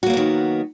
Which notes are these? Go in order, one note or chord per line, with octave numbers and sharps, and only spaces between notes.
D#3 F#3 A#3 B3 F#4